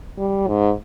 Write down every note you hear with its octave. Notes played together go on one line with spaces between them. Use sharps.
G3
G#2